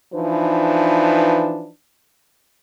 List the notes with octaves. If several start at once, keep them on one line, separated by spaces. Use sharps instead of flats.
E3 F3 D4 D#4 B4